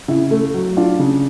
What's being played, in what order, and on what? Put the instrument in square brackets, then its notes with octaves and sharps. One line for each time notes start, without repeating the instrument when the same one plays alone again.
[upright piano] C#3 E4
A3
F#3
D4 F4
C#3